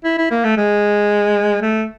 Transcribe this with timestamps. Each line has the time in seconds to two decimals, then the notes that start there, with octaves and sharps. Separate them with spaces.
0.04 E4
0.18 E4
0.31 A#3
0.44 A3
0.57 G#3
1.62 A3